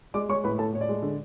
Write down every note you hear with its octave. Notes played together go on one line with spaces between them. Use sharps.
G#3 D5 D6
G#3 C#5 C#6
A2 B4 B5
A2 A4 A5
A2 C#5
D5
G#3
D3